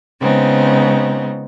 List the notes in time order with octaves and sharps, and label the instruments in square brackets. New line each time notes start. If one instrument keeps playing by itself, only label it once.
[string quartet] C#3 G#3 B3 C4 D#4